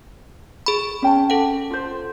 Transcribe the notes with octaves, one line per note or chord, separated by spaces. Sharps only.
G#4 B5
C#4 G5 A5
A4 F#5
F4 C5